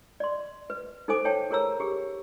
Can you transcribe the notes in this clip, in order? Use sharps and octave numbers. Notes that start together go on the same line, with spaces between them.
D5 C6
B4
D#4 A4 C5 G#5 D6
C#5 G5 A5
G#4 A#4 C#5 A#5 E6
G4 G#4